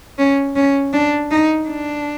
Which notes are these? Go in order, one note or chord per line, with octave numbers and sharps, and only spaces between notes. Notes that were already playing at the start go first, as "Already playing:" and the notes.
C#4
C#4
D4
D#4
D4